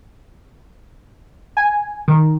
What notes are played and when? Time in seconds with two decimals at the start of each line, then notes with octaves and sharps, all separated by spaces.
1.57 G#5
2.08 D#3